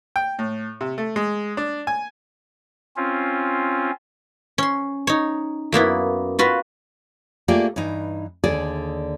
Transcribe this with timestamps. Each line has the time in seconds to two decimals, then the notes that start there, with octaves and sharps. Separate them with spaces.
0.16 G5
0.39 A2
0.81 C3
0.98 A3
1.16 G#3
1.57 D4
1.87 G#5
2.96 C4 C#4 F4
4.58 C#4 C6
5.07 D#4 C#5
5.72 F#2 A#3 B3 E4
6.39 F4 F#4 B4
7.48 A3 A#3 F4 G4 G#4 D5
7.76 G2 E3 D#4
8.44 D#2 D3 G#4 A4 D5